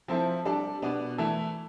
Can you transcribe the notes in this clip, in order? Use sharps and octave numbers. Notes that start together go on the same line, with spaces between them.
F3 C4 E4 A4
G3 D4 A4
B2 B3 D4
E3 A3 E4 A4